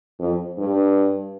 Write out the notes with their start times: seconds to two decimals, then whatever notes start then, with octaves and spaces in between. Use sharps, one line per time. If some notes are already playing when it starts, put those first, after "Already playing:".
0.19 F2
0.58 G2